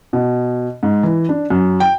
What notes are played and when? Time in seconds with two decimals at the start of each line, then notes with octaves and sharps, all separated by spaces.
0.13 B2
0.83 G#2
1.03 E3
1.29 D4
1.50 F#2
1.80 G5